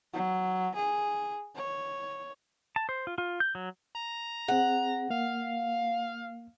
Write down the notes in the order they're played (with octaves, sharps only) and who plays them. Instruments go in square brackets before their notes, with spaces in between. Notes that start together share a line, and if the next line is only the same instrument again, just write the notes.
[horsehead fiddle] F#3
G#4
C#5
[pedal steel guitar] A5
C5
F4
F4
G6
F#3
[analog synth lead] A#5
[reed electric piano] C4 G#4 [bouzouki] F#5
[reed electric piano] A#3 [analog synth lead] F5